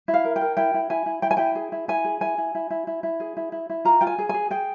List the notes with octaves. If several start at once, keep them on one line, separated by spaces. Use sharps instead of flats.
E4
F5
A#4
G5
A#4
E4 G5
E4
E4 G#5
E4
E4 G5
G#5
E4 G5
G#4
E4
E4 G#5
G#4
E4 G#5
E4
E4
E4
E4
E4
G#4
E4
E4
E4
F4 A#5
F4 G5
G#5
G#4
G#4 G#5
G#4 G5